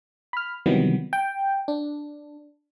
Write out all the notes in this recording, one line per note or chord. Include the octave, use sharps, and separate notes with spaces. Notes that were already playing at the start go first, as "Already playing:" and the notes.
B5 F6
C3 D#3 E3 F#3 G3 B3
G5
D4